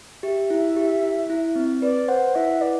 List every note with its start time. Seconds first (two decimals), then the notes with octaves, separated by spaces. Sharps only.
0.23 G4 E5
0.50 E4
0.77 G4
1.03 E4
1.30 E4
1.56 C4
1.82 B4 D5
2.08 C5 F#5
2.35 E4 E5
2.61 B4 D5